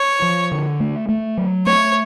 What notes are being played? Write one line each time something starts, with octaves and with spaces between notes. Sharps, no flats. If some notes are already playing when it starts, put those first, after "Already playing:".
Already playing: C#5
F3
D3
A3
A3
F#3
A3 C#5